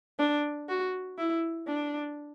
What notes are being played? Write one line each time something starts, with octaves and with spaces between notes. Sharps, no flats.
D4
F#4
E4
D4